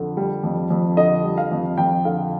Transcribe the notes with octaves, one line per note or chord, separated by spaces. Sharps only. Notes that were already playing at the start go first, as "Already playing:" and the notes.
Already playing: F2 D3
G3
F2
F2
D3 D#5
G3
F5
F2
F2 G5
D3 F5